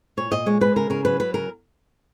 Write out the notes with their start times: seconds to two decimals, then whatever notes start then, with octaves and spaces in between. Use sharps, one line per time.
0.17 A#2 C#5
0.31 A#2 D#5
0.46 G#3 C#5
0.61 G#3 B4
0.76 C#3 A#4
0.90 C#3 A#4
1.05 F#3 B4
1.20 F#3 B4
1.34 C#3 A#4